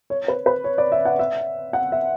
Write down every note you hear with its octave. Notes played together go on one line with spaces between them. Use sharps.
C#5
B4
B4
C#5
D5
E5
F#5
E5
F#5
E5